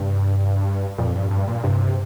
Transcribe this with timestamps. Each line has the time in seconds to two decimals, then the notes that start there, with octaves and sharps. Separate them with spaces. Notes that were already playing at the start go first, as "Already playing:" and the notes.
Already playing: G2 C3
0.98 F2 A#2
1.15 G2
1.31 G2
1.47 A#2
1.64 G2 C3